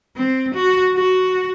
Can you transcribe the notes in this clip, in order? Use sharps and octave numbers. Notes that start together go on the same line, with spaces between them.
C4
F#4
F#4